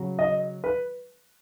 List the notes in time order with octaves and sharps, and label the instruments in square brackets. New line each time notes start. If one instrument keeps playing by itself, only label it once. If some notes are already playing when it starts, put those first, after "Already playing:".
Already playing: [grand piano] C#3 F#3
D#5
B4